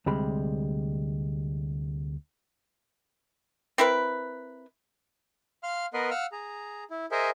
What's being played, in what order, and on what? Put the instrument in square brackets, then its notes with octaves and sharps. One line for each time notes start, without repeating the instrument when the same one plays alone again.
[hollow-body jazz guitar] D2 C3 G3 G#3 B5
[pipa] C4 E4 A#4 B4
[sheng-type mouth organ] F5 C6 F6
B3 A#4 B4 D#5 C6
F5 F#5 E6 F6
G#4 A#5
E4
G#4 A#4 C5 D#5 E5 G#5